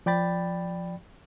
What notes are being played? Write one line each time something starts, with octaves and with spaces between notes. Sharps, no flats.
F3 D5 G5 B5 A6